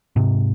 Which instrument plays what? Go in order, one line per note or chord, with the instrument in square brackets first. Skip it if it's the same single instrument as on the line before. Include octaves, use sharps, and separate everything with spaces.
[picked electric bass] G#2 C3